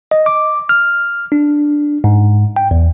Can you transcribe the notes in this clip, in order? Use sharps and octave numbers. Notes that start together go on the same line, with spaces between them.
D#5
D6
F6
D4
G#2
G5
E2